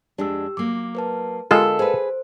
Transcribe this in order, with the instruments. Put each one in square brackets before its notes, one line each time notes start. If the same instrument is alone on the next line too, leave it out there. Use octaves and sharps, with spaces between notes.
[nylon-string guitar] F2 G#3 D4 [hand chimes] G4 E6
[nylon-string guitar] F#3 A#3 [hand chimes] D6
[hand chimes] A#4 B4 A5
[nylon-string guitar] D3 [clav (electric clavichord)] G#3 F4 [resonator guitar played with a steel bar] A4 [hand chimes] A#4 D#5 F5
[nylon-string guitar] G#4 B4 [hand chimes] C5